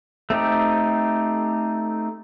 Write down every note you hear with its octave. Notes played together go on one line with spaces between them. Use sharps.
A3 C4 D#4 G4